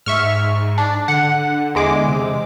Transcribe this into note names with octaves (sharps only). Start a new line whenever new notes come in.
G#2 E5 C#6 F6
D4
D3 F#5
E2 G#3 D6
C3